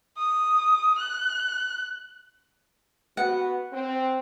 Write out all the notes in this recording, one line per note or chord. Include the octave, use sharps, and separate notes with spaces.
D#6
F#6
B3 F#4 F#5
C4